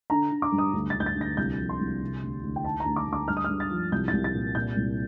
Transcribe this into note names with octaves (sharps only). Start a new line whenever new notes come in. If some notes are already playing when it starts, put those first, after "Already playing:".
D3 A#5
D3
D6
G2
D#6
D2
A6
D2 G6
A6
D2
A#6
C2 G6
F3
C6
C2
C3
D2
D2
G5
D#3 A5
A#5
D2
D6
D2 D6
G2 F6
D#6
F6
G2
A6
F3
C2 G6
A6
C2
A6
A#2
A#2 G6
C2